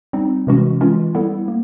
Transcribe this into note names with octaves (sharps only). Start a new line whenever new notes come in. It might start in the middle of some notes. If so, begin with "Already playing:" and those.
G3 C4 D#4
C3 E3 G#3 C#4 F#4
E3 G#3 C#4 F4
G3 B3 E4 A4
A#3